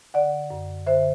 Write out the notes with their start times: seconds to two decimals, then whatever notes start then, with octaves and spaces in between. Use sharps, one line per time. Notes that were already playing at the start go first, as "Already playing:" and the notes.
0.14 D3 D5 F#5
0.51 F#2
0.87 D3 C5 E5